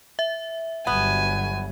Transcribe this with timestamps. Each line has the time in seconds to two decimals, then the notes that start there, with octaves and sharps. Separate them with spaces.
0.19 E5
0.87 G1 F#3 B3 G#5